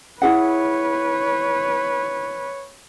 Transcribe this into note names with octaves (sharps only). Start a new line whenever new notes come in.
E4 G#4 B4 C#5 F#5